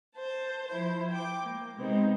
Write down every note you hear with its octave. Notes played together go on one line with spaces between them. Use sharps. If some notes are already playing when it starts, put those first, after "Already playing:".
C5 A5
F3 E4 C5
G5 D6
A#3
C3 G#3 B3 C4 D#4